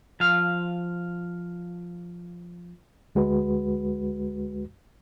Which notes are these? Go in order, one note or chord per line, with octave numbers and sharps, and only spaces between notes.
F3 F5
D2 G#3 F#4 B4